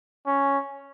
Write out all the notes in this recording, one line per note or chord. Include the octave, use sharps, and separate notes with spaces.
C#4